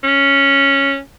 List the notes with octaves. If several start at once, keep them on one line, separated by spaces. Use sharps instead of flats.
C#4